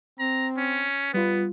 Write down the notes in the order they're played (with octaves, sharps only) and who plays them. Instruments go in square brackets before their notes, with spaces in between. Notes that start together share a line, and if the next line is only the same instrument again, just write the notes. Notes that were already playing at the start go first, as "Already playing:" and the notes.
[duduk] C4 [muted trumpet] A#5
[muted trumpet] C#4
[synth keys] G3 F4 [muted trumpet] B3 [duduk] B4